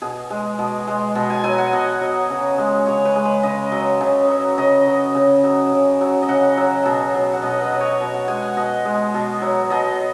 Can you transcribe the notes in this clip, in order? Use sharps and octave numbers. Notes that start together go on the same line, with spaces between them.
B2 G#4
G#3
B2
G#3
B2
G#5
F#3 G#5
F#5
B2 D#5
F#3
C#3
G#3
C#3 C#5
B4
G#3
B4
C#3 D#5
F#3
C#3
F#3
C#3 D#5
F#3
C#3
F#3
C#3
F#3
D#5
C#3 F#5
F#3
B2
F#3
F#5
B2 D#5
B4
F#3
C#5
B2
F#5
G#3 G#5
F#5
B2 D#5
G#3
B2
F#3
B2 D#5